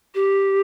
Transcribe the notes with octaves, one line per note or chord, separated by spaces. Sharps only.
G4